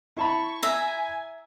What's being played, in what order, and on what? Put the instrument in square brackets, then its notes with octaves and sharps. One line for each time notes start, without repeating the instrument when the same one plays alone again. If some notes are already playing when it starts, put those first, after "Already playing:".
[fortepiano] E4 A5 B5 [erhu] C#6
[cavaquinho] E5 A#5 [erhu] G#5